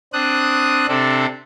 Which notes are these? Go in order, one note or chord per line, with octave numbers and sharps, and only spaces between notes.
C4 D4 D#6 F#6
C3 C4 D4 A4